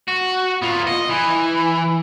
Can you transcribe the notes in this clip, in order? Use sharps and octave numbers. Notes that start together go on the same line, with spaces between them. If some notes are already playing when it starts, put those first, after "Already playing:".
F#4
B3 F4
D#5
E3